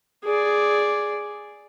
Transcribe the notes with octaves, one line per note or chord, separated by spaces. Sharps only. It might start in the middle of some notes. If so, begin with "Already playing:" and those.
G#4 D5